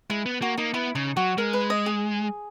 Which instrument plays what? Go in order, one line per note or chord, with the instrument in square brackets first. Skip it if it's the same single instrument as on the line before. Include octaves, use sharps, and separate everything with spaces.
[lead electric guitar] G#3 [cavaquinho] E4
[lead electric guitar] B3
[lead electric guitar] A#3 [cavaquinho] F#4
[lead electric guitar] A#3 [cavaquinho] D#4
[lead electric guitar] B3 [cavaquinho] E4
[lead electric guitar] C#3 [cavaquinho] D#4
[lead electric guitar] F#3 [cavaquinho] F#4
[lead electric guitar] G#3 [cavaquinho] A#4
[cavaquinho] B4
D#5
G#4